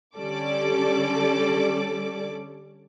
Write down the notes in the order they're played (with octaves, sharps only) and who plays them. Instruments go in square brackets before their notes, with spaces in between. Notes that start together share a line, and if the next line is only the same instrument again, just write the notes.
[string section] D3 G3 C#4 A4 D5 D6